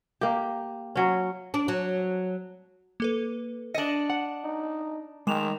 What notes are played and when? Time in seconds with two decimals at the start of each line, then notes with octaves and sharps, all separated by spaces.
0.21 A#3 G4
0.96 F#3 C#4
1.54 D4
1.68 F#3
3.00 A#3 A4 B4
3.74 D4 D#5 C#7 F#7
4.10 F#5
4.44 D#4
5.27 D#3 G#3 D6 E7 F7